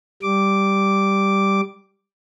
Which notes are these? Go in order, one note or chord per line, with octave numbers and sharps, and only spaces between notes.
G3 D6